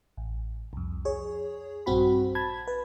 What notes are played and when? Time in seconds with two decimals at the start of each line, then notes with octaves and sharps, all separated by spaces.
0.17 A1
0.73 C2 F2
1.05 G#4 C#5
1.86 A#1 G2 C4 F#4 B5
2.35 A5 B5 G#6
2.68 B4